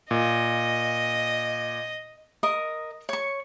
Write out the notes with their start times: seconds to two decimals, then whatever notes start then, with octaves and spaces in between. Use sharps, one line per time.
0.11 A#2 D#5
2.43 A#4 D#5 D#6
3.09 C#5 C#6